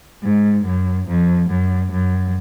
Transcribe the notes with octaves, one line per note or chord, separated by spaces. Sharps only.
G#2
F#2
F2
F#2
F#2